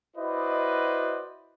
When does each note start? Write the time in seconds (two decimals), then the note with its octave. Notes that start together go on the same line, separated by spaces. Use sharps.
0.17 E4 F#4 B4 C5 D5 D#5